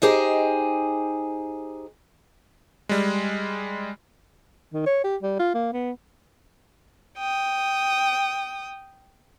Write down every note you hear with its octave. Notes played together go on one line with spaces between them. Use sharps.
D#4 G4 G#4 C5 D#5
G3 G#3
D#3
C#5
G4
G3
F4
A#3
B3
G5 D#6